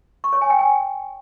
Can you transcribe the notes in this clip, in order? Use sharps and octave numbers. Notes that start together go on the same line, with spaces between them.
C#6
C#5
G#5
G5
G#5